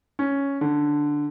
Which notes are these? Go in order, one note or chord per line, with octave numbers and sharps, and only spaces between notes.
C#4
D3